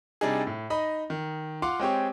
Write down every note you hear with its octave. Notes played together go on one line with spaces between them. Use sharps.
C3 G3 D4 D#4 G#4
A2
D#4 D#5 B5
D#3
F4 F5 F#5 C6 D6
G#3 C4 G4 C#5